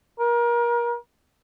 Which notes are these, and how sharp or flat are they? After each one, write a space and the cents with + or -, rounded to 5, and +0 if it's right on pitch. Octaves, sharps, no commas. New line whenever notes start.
A#4 +30